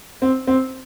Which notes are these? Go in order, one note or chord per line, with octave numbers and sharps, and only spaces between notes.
C4
C4